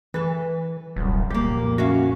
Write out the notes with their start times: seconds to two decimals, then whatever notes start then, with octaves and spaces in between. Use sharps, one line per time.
0.14 E3 A4 B4
0.96 D#1 C2 F#2
1.30 F2 A#2 G3 A#3 G4
1.78 C#4 F#4 E5 F5